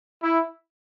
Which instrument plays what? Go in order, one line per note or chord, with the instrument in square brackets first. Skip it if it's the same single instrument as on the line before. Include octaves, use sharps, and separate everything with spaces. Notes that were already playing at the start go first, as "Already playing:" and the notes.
[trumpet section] E4